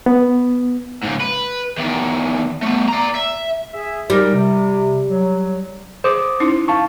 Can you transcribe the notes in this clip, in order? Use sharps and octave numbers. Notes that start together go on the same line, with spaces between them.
B3
G#2 C#3
B4
E2 D#3
A3 B3
D5 A#5
E5
G#4 E5
G3 G#3 D#4 A#4
C3
F#3
G#4 C5 D6 D#6
C#4 D#4 E4
F5 A5 C#6